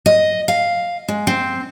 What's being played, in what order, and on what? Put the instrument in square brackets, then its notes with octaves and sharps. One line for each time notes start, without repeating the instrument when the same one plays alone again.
[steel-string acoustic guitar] D#5
F5
G#3
C4